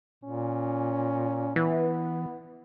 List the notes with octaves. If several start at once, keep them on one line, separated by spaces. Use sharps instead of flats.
A#2 C#4
E3 B3